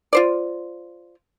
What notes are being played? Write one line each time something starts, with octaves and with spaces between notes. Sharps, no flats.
F4 C5 D5